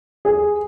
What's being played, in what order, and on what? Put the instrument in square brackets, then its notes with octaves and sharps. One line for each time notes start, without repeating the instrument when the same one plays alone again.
[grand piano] G#4